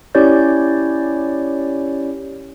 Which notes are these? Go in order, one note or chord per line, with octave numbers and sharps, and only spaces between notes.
C#4 E4 G4 C#5 D5 G6